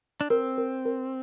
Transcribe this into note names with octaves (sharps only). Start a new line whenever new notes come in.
D4
C4 A#4
A#4
A#4